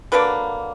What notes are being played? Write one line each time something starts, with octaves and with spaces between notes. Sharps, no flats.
D3 F#3 A#3 D4 B4